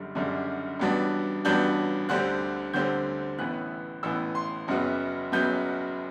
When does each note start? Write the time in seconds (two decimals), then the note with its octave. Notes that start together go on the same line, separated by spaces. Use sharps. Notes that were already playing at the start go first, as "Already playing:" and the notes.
Already playing: F#1 F#2 D3 G3
0.15 F#1 F#2 D3 G3
0.79 A1 G2 F#3 B3 D4
1.45 A1 G2 F#3 B3 D4 G6
2.09 D2 D3 G3 C4 F#6
2.73 D2 D3 G3 C4 G6
3.39 A1 A2 E3 B3 F#6
4.03 A1 A2 E3 B3 E6
4.35 C6
4.68 F#1 F#2 F#3 B3
5.32 F#1 F#2 F#3 B3 G6